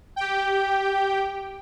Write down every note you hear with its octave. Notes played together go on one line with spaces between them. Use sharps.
G4 G5